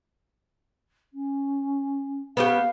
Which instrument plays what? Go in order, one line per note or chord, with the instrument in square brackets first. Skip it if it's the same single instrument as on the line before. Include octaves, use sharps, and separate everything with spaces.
[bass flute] C#4
[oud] B3 C#4 G4 [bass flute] F5